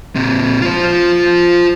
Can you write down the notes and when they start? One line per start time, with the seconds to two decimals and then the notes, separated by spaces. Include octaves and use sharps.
0.15 A#2 C4
0.62 F4 C5